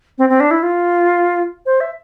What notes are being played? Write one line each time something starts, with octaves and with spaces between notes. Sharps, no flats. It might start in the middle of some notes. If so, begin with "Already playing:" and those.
C4
C4
D4
E4
F4
C5
E5